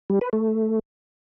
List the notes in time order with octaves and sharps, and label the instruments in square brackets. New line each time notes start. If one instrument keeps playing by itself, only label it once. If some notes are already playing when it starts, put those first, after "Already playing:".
[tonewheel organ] G3
B4
A3